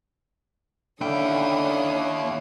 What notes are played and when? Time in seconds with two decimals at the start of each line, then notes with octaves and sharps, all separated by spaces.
1.01 D#2 D3 C#4 E4 F5 G5 D#6